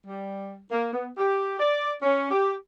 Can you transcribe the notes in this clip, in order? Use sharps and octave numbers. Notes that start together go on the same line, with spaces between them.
G3
A#3
B3
G4
D5
C#4
G4